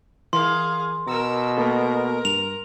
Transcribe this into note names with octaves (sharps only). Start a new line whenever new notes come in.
E3 G#4 A#4 F5 C6
B2 A#4 A#5 E6
A#3 B3 A4 A#4
G2 F7